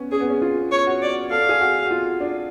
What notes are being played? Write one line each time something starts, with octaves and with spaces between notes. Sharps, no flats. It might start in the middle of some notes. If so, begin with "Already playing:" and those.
Already playing: B3 C#4
C#4 G#4
B3
C#4
F4
C#5
F#4
D5
A4 F5
G#4
F#4
F#4
F4
D4